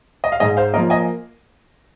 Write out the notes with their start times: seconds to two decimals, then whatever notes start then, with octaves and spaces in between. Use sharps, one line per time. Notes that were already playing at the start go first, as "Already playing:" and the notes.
0.24 D#5
0.32 F5
0.40 G#2 D#5 G#5
0.57 C5 F5
0.74 F3 A#3 A#4 D#5
0.90 D#5 G#5